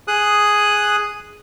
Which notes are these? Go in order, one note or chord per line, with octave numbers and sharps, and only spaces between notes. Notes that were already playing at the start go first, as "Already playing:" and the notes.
G#4 D#6 F#6